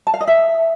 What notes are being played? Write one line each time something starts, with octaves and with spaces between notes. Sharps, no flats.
A5
F5
D#5
E5